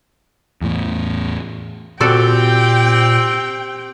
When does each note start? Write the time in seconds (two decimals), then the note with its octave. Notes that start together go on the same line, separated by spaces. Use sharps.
0.61 E2 A2
2.01 A#2 C4 F#4 G4 A4 D5 G5